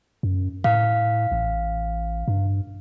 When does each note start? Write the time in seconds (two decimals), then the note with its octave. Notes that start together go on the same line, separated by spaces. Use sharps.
0.23 F#2
0.64 A2 F5
1.32 A1
2.28 G2